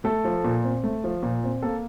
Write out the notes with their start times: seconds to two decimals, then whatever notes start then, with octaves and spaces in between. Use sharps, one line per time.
0.04 A3 A4
0.25 F3
0.44 A#2
0.64 C4
0.84 A3
1.04 F3
1.23 A#2
1.44 C4
1.62 A#3 A4